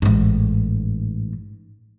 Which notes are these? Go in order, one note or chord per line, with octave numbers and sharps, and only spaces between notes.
A1 G#2